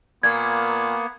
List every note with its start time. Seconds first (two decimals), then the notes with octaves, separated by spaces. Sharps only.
0.23 A#2 A#3 B3 G#6